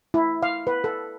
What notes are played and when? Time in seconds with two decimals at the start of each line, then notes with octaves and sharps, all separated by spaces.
0.14 E4
0.43 F5
0.67 B4
0.84 A4